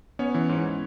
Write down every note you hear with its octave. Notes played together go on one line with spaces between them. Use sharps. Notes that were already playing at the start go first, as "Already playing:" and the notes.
B3 C#4 C#5
E3
G#2